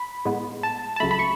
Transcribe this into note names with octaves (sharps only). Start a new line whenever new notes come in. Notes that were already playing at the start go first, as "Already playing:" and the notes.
Already playing: B5
A2 G#3 B3
A5
A5
C#2 C#3 F#3 A3 B5
B5
C#6